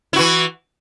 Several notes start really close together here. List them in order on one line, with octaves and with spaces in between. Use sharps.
E4 F#4 E3